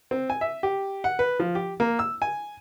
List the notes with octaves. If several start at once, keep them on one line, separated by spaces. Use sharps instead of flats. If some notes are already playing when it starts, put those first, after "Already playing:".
C4
G#5
E5
G4
F#5
B4
F3
G4
A#3
E6
G#5